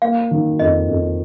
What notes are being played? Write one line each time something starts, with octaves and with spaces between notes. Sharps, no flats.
A#3 F5
D#3
F2 D#5
F2